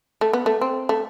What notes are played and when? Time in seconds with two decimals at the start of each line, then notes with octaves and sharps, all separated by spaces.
0.21 A3
0.33 B3
0.46 A3
0.61 C4
0.89 A3